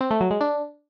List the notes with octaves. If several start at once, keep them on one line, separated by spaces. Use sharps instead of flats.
C4
A3
F#3
G#3
D4